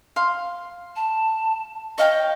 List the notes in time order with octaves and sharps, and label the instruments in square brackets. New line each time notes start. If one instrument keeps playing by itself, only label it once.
[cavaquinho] F5 C6
[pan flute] A5
[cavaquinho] C#5 F5 G5 [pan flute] D#5